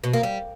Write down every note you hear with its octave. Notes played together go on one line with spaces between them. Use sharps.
B2
A#3
G3